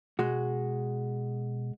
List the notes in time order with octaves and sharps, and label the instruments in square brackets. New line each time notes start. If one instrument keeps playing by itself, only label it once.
[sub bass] B2 [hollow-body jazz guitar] G#3 F#4